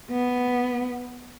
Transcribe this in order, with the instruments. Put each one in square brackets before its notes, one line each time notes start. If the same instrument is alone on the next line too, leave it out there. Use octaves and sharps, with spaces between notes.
[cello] B3